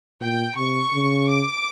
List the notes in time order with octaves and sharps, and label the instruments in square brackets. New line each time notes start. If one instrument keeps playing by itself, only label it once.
[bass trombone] A#2 [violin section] G5
[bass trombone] C3 [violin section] C#6
[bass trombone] C#3
[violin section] D6